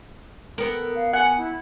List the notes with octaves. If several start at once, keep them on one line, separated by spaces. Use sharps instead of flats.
B3 A4 A#4
F5
F#5 G#5
E4